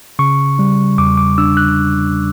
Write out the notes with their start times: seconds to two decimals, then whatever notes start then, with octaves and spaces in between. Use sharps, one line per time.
0.19 C#3 C#6
0.59 G3
0.98 E2 D6
1.18 D6
1.38 D4 E6
1.57 F#6